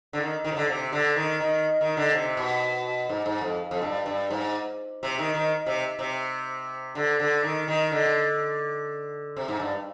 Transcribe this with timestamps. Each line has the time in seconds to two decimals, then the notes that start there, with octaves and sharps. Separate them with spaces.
0.13 D3
0.20 D#3
0.44 D#3
0.51 C3
0.56 D3
0.68 C3
0.93 D3
1.16 D#3
1.40 D#3
1.81 D#3
1.97 D3
2.13 C3
2.37 B2
3.09 G#2
3.26 G#2
3.41 F2
3.71 F2
3.82 G2
4.06 G2
4.30 G#2
5.03 C3
5.19 D#3
5.34 D#3
5.66 C3
5.99 C3
6.95 D3
7.19 D3
7.43 D#3
7.68 D#3
7.92 D3
9.36 C3
9.48 G#2
9.60 G2